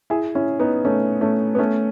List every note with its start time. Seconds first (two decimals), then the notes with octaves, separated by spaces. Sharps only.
0.10 E4 G#4
0.35 C#4 E4
0.60 B3 D#4
0.85 A3 C#4
1.21 A3 C#4
1.55 B3
1.59 A3 C#4